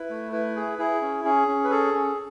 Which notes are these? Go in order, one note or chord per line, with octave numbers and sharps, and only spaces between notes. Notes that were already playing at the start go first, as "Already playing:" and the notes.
Already playing: E4 B4
A3
E4 B4
G#4
E4 G#4
C#4
C#4 G#4
C#4
B4
G#4 A4
C#4